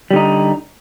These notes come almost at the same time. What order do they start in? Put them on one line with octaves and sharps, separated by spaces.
G3 D3 D#4